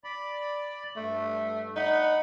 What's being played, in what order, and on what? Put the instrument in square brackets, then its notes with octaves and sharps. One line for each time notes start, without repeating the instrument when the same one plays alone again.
[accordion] D5 B5
[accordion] G2 [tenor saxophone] A3
[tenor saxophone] D#4 [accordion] F#5 B5